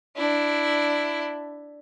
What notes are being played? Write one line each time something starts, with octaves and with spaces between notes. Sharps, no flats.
D4 E4